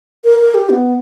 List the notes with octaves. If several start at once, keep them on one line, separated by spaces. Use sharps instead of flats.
A#4
A#4
G4
B3